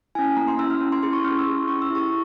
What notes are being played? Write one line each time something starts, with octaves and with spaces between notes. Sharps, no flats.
C#4 E4 G#5
A#3 A#5
C6
C#4 E4 E6
F6
C#4
C6
E4 G#4 C6
C#6
C#4 F6
E6
E4 G#4
C#4 C#6
E6
E4 G4 C#6